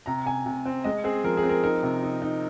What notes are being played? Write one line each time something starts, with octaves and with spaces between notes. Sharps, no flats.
C3 A#5
C3 G#5
C3
C4
G#3 D#5
C4 G#4
F3 A#4
G#4
C4
A#4
D#4 A#4
C3
D#4
D#4